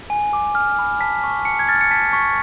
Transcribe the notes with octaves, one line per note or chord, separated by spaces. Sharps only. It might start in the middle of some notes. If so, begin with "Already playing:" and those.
G#5
D6
F6
B5
A5 B6
C#6
A5 C#7
G#6
F6 A6
C#7
A5 B6
C#6 B6